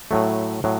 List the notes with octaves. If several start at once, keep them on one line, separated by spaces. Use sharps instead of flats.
A2 F#3 A3
A2 F#3